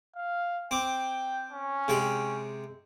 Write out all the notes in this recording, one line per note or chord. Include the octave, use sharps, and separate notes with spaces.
F5
C4 G5 D6
C#4
C3 G#3 G5